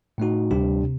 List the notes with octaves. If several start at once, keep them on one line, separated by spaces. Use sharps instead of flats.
A2 A3 D#4 F#4
D2 C3 G3 D4 G4
C3